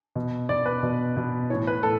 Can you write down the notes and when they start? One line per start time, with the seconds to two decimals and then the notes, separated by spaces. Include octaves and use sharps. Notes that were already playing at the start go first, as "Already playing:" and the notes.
0.16 B2
0.49 B2 D5
0.66 B4
0.83 B2
1.17 B2
1.50 E3 C#5
1.54 A2
1.67 B4
1.83 A2 A4